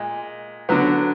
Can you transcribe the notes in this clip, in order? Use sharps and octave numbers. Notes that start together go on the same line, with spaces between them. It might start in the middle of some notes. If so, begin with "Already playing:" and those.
Already playing: A#2 G#3
D3 F#3 B3